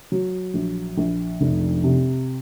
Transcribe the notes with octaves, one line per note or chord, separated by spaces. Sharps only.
F#3
A#1
A#1
F1
C3